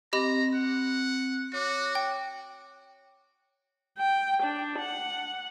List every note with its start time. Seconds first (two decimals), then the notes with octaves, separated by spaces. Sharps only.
0.13 C4 G4 D#5 A#5 B5
0.54 F#5
1.53 F#4 C#5 D6
1.95 G5
3.98 G5
4.42 D4
4.79 F#5